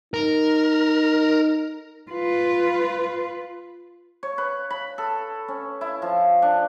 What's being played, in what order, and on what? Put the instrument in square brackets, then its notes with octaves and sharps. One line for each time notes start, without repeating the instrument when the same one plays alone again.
[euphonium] D#4 [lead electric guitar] A#4
[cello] F4 B4
[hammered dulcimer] C#5
B4
B5
A4
C#4
E4
F3
D4